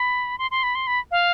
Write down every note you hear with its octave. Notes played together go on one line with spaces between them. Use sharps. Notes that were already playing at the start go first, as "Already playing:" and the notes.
Already playing: B5
C6
C6
B5
C6
B5
F5